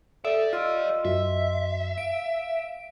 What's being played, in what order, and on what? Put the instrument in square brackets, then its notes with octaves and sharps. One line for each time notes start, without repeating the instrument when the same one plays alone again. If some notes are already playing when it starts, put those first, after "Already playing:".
[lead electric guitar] G4 D5 [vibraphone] A4 D#6 [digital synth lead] E5
[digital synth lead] F4 [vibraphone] D#5 C6 E6
[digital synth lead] F#2 [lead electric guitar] E5
[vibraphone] F5 [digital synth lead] D7